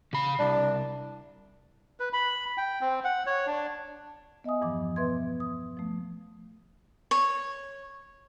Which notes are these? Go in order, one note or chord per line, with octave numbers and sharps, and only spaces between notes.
C#3 B5
C2 D4
B4
B5
G5
C4
F#5
C#5
D4
B3 D#5 E5 G#5 D#6
E2 G2 E3 F3 D6
B2 B3 B4 E5 C6 G#6
D#6
F3 A3
C#5